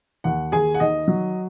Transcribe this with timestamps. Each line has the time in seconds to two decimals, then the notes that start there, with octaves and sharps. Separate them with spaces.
0.24 D#2 F#5
0.52 D#2 G#4 G#5
0.74 F#5
0.80 D#3 D#5
1.08 F#3